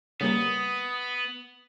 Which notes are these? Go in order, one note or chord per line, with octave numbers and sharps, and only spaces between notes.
C#3 G3 A#3 B3 D#6